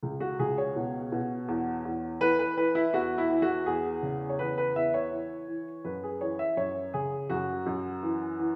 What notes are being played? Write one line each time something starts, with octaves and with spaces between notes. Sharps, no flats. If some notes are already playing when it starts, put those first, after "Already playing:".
C#2
F#4
C#2 G#4
C#5
B2
B2
E2
E2
E3 B4
B4
E3 B4
E4
E2 F#4
E4
E3
F#4
E2 G#4
C#3
C#5
E2 B4
B4
E2 E5
C#5
E3
E3
F#2 B4
G#4
E3 C#5
E5
F#2 C#5
C#3 G#4
F#2 F#4
F#2
E3
E3